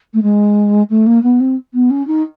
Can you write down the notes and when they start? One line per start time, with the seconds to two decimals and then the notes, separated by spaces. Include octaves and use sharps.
0.13 A3
0.22 G#3
0.90 A3
1.06 A#3
1.23 B3
1.40 C4
1.74 B3
1.90 C#4
2.07 D#4